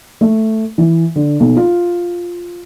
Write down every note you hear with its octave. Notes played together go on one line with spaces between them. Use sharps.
A3
E3
D3
B1
F4